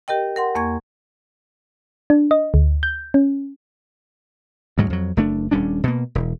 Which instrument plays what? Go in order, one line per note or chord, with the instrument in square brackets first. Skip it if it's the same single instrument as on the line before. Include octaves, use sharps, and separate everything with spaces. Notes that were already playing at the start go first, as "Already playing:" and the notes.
[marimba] G4 A#4 D#5 G5
A#4 F#5 C6
E2 A#3 C#6 G#6
[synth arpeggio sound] D4
D#5
D2
G6
C#4
[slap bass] D2 G#2 F#3
F2 F#3
F#1 A3 D4
D#1 G3 C#4 D4
B2 A#3
E1